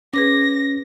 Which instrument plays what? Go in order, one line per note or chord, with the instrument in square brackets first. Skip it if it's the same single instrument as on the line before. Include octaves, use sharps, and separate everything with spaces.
[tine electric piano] C#4 [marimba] G#4 B4 D6 [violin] A#6